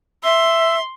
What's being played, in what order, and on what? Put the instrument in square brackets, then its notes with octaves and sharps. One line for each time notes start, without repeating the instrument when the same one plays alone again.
[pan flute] E5 [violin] C6 [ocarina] E6